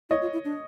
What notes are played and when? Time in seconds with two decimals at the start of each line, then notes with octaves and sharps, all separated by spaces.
0.10 E4 C#5 D#5
0.22 F4
0.33 E4
0.45 D4